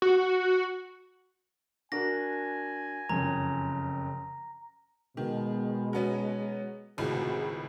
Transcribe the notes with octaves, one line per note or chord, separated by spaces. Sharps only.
F#4
D4 F#4 A#4 G#5 A#6
F#1 F2 C#3 A#5
B2 D#3 G#3
F#3 B3 C#4
G#1 C#2 A2 C3 F#4 G#4